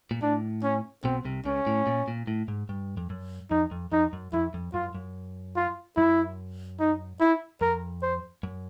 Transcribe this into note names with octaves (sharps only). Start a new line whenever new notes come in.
A#2
A2 D4
C#4
B1 B2 C4
C2 C3
C#2 C#3 C#4
A2
A#2
A#2
A2
G#2
G2
F2
F#2
F2 D#4
F2
F2 D#4
F#2
F2 E4
F2
F#2 F4
F#2
F4
F#2 E4
D#4
E4
F2 A#4
C5
F#2